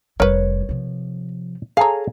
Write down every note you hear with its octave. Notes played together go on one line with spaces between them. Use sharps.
F1 G3 A#4 B4 C#5
C3 F3
G#4 A4 C#5 F5 A#5